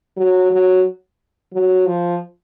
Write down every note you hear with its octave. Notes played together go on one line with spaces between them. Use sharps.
F#3
F#3
F#3
F3